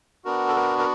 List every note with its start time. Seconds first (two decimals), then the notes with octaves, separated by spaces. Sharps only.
0.25 B3 D4 F#4 A#4
0.48 A4
0.56 A#4
0.79 A#4